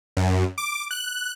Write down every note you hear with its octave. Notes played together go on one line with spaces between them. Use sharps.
F#2
D6
F#6